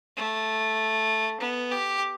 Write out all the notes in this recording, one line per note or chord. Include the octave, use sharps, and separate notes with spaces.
A3
B3
G4